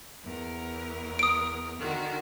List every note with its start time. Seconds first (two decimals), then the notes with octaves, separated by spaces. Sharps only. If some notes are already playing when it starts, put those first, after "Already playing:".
0.25 E2 A#4
1.19 D#6 D7
1.80 D3 D#3 F#4